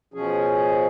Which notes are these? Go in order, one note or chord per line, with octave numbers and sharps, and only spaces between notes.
B2 F3 C#4 G#4